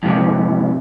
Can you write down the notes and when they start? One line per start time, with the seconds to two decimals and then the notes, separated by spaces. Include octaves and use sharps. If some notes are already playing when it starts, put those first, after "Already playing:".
0.03 F2 G#2 C3